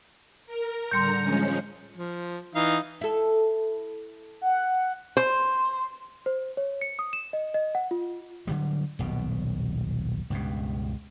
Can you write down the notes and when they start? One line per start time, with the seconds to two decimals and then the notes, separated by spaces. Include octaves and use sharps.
0.46 A#4
0.91 A2 D3 G3 A#5 C6 G6 C#7
1.22 F3 G#3 C#4
1.96 F3
2.55 E3 D#4 F5
3.01 E4 A4
4.42 F#5
5.17 C5
6.26 C5
6.57 C#5
6.81 C#7
6.99 D#6
7.13 E7
7.33 D#5
7.54 D#5
7.75 F#5
7.91 F4
8.47 D3 F#3 G3
8.99 D#1 B1 B2
10.30 C#2 G2 B2